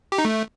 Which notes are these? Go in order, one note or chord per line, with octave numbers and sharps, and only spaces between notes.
G4
D#4
A3